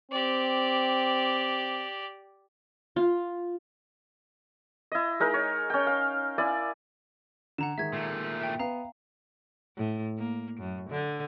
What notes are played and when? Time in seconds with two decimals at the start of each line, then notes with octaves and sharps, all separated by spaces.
0.12 C4 G4 D5
2.96 F4
4.92 E4 D#5
5.20 G#3 D#4 A#4
5.34 C#5
5.70 C#4 G5
5.87 F5
6.38 E4 D5 G#5
7.58 D3 F#5 A#5 E7
7.78 D#3 G#3 E5 G#6
7.93 A#2 A3
8.41 E5 G5
8.59 B3 F5 A#5
9.77 A2
10.18 A#3
10.60 F#2
10.90 D3